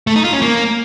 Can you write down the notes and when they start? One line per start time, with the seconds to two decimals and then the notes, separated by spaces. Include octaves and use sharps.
0.07 A3
0.16 D#4
0.24 F4
0.33 C#4
0.42 A#3